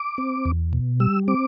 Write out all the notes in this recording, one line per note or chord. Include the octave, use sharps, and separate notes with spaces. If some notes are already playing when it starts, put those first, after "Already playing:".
Already playing: D6
C4
E2
B2
G3 E6
C4 D6